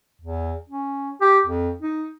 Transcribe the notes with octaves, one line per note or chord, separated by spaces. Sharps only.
E2
C#4
G4
F2
D#4